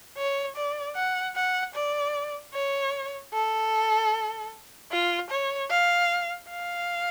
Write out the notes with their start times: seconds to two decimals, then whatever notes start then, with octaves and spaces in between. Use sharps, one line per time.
0.18 C#5
0.56 D5
0.96 F#5
1.36 F#5
1.75 D5
2.54 C#5
3.34 A4
4.92 F4
5.30 C#5
5.71 F5
6.49 F5